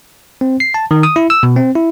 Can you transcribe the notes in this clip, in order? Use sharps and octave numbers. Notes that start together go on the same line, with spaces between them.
C4
C7
A5
D#3
D#6
E4
E6
B2
C4
E4